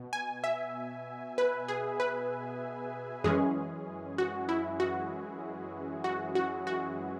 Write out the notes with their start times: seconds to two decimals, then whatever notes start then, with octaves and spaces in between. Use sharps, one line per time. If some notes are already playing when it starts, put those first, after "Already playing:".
Already playing: B2
0.13 G#5
0.44 E5
1.38 B4
1.68 G#4
2.00 B4
3.24 F#2 E3 G#3 C#4 G#4
4.18 F#4
4.49 E4
4.80 F#4
6.04 F#4
6.35 F#4
6.67 F#4